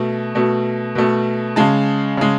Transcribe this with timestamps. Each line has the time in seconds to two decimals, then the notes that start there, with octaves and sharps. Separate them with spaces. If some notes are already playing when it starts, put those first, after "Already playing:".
Already playing: B2 A3
0.35 B2 A3
0.95 B2 A3
1.56 C#3 G#3 A5
2.17 C#3 G#3